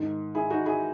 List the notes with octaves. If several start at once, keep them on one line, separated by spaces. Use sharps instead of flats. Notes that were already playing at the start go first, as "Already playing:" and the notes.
Already playing: G#2 D#3
E4 G#4
D#4 F#4
E4 G#4